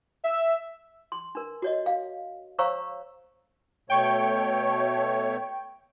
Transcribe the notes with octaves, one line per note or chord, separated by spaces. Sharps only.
E5
C6
D4 A#4
F#4 C#5 D#5
F5
C5 C#5 F5 A#5 C#6 E6
B2 A3 C#5 G5 C#6